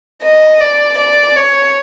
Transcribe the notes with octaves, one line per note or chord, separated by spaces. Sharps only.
D#5
D5
D5
C#5